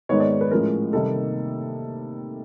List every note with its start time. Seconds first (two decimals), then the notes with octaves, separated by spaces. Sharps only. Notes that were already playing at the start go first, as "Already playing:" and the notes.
0.09 G#2 D#3 G#3 B3 D#4 C#5
0.20 D5
0.31 C#5
0.41 B4
0.51 A2 F3 G#3 C#4 A#4
0.93 C3 D#3 G3 A#3 D#4 A4